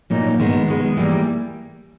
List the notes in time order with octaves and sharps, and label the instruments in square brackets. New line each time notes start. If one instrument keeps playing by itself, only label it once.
[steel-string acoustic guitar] A#2 F#3 A#3 D#4
D#3 G#3 B3
D#3 G#3 B3
E3 G3 A#3